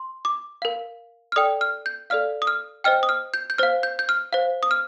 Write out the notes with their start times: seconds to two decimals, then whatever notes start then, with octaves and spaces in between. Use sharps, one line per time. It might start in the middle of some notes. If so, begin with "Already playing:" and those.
Already playing: C6
0.25 D6
0.62 A#4 F5
1.32 F6
1.36 A4 D5 G5 D#6
1.61 F6
1.86 G6
2.10 A4 D5 F5 F6
2.42 D#6
2.47 F6
2.84 C5 D#5 G5 F6
3.03 D#6
3.09 F6
3.34 G6
3.50 G6
3.58 C5 F5 F6
3.83 G6
3.99 G6
4.09 F6
4.33 C5 F5
4.63 D#6
4.71 F6